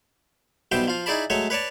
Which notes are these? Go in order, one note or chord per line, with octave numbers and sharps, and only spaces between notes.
B1 B2 G3 C5 E5 G5
F3 F4
D#4 E4 G#4 D5 A5 B5
F#3 G#3 A3 C#5 E5
B4 C#5 D5 A5